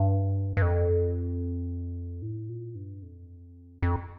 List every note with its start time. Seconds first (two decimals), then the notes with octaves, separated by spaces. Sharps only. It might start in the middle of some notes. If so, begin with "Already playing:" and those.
Already playing: G2
0.57 G2
0.62 F2
2.22 A2
2.49 A#2
2.75 G2
3.02 F2
3.82 F2